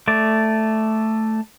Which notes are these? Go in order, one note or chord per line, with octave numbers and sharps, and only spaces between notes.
A3 D5